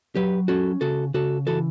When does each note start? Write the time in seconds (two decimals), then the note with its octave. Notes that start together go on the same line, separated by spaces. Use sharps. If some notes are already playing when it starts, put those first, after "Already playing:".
0.15 F#3 G4 B4
0.48 C#4 F#4 A4
0.81 C#3 F#4 A4
1.14 C#3 F#4 A4
1.47 E3 F#4 A4